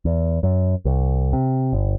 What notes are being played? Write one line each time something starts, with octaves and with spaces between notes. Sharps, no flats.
E2
F#2
C2
C3
G1